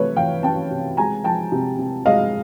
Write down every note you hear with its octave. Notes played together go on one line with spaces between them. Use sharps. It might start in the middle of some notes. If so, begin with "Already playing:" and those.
Already playing: C3 E3 A3 B4 C#5
E3 F5 G5
C#4 G5 A5
C3
G#3 G#5 A#5
F3 G5 A5
C3
C3
G#3 D#5 F5